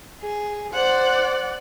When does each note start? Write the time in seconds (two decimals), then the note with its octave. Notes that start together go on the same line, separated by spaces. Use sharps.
0.21 G#4
0.73 C5 D5 F#5